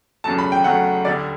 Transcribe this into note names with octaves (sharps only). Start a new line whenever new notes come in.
E2 C#3 F#3 A3 A5
B5
G5
E2 C#3 F#3 A3 F#5
D2 D3 G3 D5